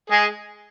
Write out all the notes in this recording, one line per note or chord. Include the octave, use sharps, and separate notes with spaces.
G#3 G#4